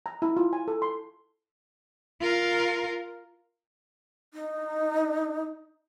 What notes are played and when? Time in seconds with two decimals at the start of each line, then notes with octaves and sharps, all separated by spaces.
0.06 A#5
0.22 E4
0.37 F4
0.53 G#5
0.68 A4
0.82 C6
2.21 F4 A#4
4.34 D#4